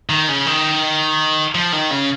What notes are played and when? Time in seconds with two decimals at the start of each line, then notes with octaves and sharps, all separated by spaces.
0.10 D#3
0.29 C#3
0.46 D#3
1.55 F3
1.73 D#3
1.91 C#3